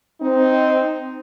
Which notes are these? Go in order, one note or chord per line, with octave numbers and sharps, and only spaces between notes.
C4 D#4